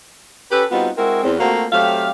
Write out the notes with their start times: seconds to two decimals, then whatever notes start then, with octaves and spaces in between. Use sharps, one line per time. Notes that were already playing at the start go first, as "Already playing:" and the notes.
0.52 C#4 G4 A4 B4
0.72 G3 B3 C4 D#4 F4 F#4
0.98 G#3 C4 E4 F#4 A#4
1.24 E2 C4
1.39 A3 A#3 C4 F4 F#4
1.72 F#3 A3 C4 G4 F5